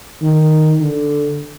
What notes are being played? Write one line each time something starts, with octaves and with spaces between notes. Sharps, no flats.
D#3
D3